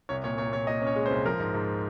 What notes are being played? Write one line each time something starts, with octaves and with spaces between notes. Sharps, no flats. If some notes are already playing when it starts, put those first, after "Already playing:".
C2 C#5
A#2 C#5
A#2 C#5
A#2 C#5
A#2 D#5
C#4 C#5
G#3
C5
C2
F3 A#4
G#2
G#2